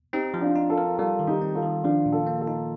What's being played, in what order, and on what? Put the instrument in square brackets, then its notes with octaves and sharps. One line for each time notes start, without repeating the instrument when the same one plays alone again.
[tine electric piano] C4 [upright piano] D#4 G4
[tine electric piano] F3
[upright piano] D4 F4
[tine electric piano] D#4
[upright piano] F4 A4
[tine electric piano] A#4
[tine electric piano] G3 [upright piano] F4 A4
[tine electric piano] D#3
[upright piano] D#4 G4
[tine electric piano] C4
[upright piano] F4 A4
[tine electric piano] D#3
[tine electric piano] F3 [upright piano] D4 F4
[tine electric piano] A#2
[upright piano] F4 A4
[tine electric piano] A#3
[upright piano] F4 A4
[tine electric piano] D#4